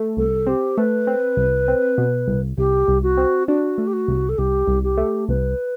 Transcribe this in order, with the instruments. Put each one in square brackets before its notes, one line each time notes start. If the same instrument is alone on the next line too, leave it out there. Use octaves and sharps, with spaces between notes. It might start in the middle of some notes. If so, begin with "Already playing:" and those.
Already playing: [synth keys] A3
[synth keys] C2 [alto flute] A4
[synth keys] C4 [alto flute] G4
[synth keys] A3 [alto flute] B4
[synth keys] C4
C2
C4
B2
C2
[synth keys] C2 [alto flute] G4
[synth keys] C2
[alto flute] F#4
[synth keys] C4
[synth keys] D4 [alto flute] F#4
[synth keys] A3
[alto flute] G4
F#4
[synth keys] C2
[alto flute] A4
[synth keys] C2 [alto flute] G4
[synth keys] C2
[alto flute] G4
[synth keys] A3
[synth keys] C2 [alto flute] B4